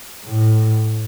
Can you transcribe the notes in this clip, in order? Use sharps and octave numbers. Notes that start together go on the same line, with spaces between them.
A2